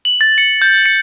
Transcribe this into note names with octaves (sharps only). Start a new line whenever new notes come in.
F#7
A6
C#7
G6
C#7